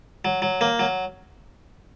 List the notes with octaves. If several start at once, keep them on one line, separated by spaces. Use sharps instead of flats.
F#3
F#3
A#3
F#3